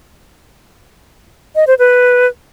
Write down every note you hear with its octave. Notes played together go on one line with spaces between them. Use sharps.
D#5
C5
B4